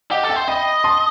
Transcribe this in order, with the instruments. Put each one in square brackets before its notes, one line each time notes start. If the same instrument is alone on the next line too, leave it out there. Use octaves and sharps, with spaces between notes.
[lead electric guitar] G4 [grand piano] D#5 F#5
[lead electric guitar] A4
[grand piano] E5 G5
[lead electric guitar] C5
[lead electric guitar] D#5 [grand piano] G5 B5
[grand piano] A5 C6